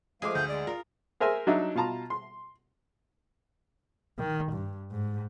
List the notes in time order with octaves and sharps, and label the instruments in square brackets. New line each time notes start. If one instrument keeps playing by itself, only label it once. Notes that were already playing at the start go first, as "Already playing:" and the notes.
[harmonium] F3 A3 F5 [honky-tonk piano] G#3 C5 D6 [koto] G#4
[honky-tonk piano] D2 [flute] G6
[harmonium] G#3 [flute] D5
[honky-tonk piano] F4 [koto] A#4
[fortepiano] G#4 A#4 C5 E5 G#5
F#3 D4 D#4 E5
B2 F4 A5 A#5
C6
[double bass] D#3
G2
G#2